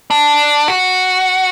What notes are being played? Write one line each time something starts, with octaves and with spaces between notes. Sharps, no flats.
D4
F#4